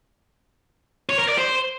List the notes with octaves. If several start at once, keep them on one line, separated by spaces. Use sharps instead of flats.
C#5
A#4
D5
C5